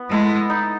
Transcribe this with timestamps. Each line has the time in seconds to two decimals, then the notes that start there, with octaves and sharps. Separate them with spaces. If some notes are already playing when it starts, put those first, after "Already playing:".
Already playing: B3
0.11 G#3 E4 A4
0.50 D#4